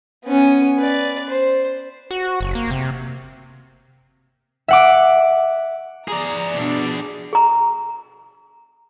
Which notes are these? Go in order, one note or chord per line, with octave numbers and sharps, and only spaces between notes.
B3 C#4
B4 D5
C5
F#4
F#1
A#3
C3
E5 F#5 D6
G#4 D5 A#5
B2 D4
G#4 A#5